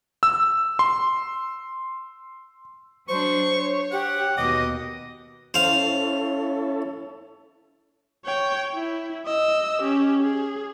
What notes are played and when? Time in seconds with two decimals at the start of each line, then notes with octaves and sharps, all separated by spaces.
0.23 E6
0.79 C6
3.09 F#3 D4 C5 C#6
3.54 C#5
3.92 G4 F#5
4.37 D#2 B2 D#5 D6
5.54 C#4 E4 A4 C5 F5
8.25 C#5 G5
8.75 E4
9.26 D#5 E6
9.82 C#4 G4
10.22 G#4